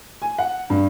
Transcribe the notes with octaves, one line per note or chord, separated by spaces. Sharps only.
G#5
F#5
G2